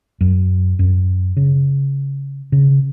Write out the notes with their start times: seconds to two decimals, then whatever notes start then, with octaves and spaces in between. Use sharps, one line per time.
0.21 F#2
0.79 F#2
1.37 C#3
2.52 C#3